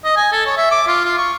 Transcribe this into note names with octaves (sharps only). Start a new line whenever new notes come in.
D#5
G#5
A4
C#5
E5
D6
F4
F4
C#6